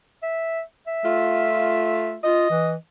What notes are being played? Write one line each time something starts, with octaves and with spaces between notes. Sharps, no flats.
E5
E5
A3 F4
F4 D#5
E3